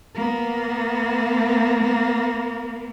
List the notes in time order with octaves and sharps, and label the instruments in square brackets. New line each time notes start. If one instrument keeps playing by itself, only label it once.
[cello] A#3 B3